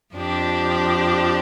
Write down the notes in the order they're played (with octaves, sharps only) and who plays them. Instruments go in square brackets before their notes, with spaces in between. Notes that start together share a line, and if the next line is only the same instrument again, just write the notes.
[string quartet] F2 F3 D4 G4